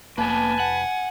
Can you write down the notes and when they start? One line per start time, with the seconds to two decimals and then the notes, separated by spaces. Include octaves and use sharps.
0.18 F1 A#3 B3 B4 G#5 A5
0.60 F#5